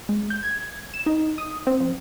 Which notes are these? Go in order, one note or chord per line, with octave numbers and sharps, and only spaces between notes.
G#3
G6
G#6
E7
D#4
D#6
C4
F3